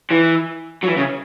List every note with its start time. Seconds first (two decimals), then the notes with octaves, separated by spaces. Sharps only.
0.11 E3
0.84 F#3
0.89 E3
0.98 C#3